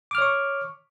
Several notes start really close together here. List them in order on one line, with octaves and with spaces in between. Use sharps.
D6 F6 C#5 C#6